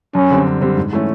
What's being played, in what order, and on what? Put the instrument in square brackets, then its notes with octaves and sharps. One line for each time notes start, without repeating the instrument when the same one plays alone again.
[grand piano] F#2 [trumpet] C#4
[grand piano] D3 G3 C4
F#2
D3 G3 C4
G#2
E3 A3 C#4